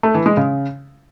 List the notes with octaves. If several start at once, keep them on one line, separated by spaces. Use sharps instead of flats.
A3
E3
G#3
C#3